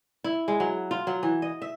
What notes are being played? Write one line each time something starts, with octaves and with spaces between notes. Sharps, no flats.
E4
G#3
F#3
F4
F#3
E3
D#5
E5